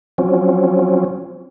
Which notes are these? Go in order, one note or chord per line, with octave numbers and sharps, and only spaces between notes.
F3 F#3 C4 C#4